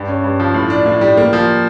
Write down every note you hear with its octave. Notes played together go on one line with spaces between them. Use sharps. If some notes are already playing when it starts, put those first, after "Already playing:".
Already playing: G2 G3
C#4
G2
F3
A2
D4
A2
G3
A#3
F3